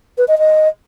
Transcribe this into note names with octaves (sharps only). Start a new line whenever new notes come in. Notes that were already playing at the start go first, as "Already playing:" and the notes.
B4
D#5
D#5